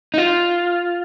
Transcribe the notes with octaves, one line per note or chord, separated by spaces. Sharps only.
D#4
F4